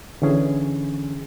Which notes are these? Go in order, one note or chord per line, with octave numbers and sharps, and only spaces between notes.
D3 E3 C#4 G#4